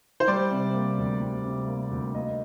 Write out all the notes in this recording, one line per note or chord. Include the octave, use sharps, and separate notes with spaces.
C5
G3 D5
C3
A#3
D2
G3
C3
A#3
D2
A#3 D#5